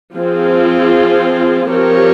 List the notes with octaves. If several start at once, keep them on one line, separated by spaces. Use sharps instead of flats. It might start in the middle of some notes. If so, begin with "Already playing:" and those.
F3 C4 F4 G#4
F3 C4 G4 A#4 C#5